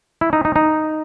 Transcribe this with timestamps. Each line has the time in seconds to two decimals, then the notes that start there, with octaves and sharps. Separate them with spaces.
0.21 E4
0.33 D#4
0.45 D#4
0.56 D#4